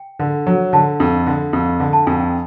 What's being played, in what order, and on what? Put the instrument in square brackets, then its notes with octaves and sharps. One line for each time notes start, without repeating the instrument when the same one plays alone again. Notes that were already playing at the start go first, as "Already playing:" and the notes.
Already playing: [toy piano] G5
[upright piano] D3
F#3
[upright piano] D3 [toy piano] A5
[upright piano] F2
D3
F2
D3
[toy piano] A5
[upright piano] F2 [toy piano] G#5
[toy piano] G5